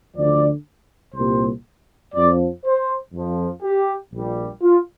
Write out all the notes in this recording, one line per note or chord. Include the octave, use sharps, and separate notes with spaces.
D2 D3 F3 D5
C2 A#2 G3 C5
F2 F3 D5
C5
F2 F3
G4
A#1 A#2 G3
F4